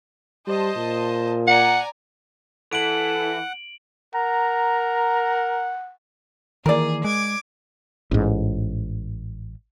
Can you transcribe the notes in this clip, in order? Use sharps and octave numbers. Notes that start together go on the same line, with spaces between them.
G3 C5 D#5 A5
A#2
D5 F#5 G#5 A#5
E3 A4 F#5 D7 F#7
A#4 F#5 A#5
D#3 E3 A#3 G#4 A#4 D5
G#3 D6 G#6
A1 G#2